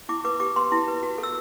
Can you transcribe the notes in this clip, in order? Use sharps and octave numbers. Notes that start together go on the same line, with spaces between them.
E4 D6
B4 D6
G4 D6
B4 C6
E4
B4
F#4
A4
E6